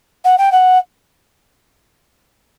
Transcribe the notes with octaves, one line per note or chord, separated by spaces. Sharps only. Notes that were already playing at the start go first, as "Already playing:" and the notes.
F#5
G5
F#5